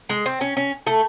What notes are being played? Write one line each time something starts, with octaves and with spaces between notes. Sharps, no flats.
G#3
C4
C#4
C#4
A3